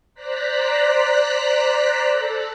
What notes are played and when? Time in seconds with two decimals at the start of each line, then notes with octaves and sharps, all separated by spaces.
0.14 C5 D5 A#5 F#6 B6
2.09 A4